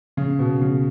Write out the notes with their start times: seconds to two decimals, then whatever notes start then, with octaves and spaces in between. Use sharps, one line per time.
0.17 C#3
0.39 B2
0.61 C#3